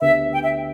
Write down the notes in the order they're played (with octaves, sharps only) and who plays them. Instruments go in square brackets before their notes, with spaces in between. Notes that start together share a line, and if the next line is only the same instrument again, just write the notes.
[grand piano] D2 D3 B3 D4 G4 [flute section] E5
[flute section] G5
E5